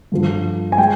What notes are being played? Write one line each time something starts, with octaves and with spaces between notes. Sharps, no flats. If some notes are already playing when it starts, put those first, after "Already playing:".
G2 D3 F3
G#5
G#3 G5